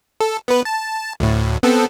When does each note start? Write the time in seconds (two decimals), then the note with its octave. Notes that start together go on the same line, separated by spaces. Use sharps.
0.21 A4
0.48 B3 B4
0.65 A5
1.20 D2 A2
1.63 B3 C4 A4